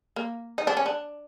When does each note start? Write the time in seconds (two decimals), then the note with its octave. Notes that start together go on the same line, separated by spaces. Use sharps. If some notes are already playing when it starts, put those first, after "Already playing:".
0.16 A#3
0.58 D#4
0.67 D4
0.77 C#4
0.86 D4